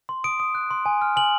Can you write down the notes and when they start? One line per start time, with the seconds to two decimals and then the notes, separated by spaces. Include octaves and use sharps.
0.09 C6
0.24 D#6 D7
0.40 D#6
0.55 F#6
0.71 C6
0.86 G#5
1.02 F6
1.16 G#5 F#7